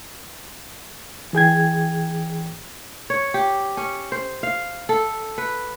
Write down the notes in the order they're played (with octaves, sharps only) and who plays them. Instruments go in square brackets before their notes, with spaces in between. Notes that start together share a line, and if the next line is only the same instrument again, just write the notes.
[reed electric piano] E3 G#4 G5 G#6
[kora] C#5
G4
C#4
C5
F5
A4
B4